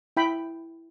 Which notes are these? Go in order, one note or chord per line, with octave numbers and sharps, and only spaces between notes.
E4 G5 B5